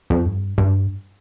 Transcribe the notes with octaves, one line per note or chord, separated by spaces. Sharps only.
F2
G2
G2